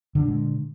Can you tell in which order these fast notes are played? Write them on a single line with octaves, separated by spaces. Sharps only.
D3 D4 A#2 G#3